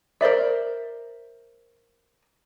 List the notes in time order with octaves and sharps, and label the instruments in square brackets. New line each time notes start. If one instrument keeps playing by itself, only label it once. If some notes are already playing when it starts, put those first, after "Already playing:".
[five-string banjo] A#4 C5 D5 E5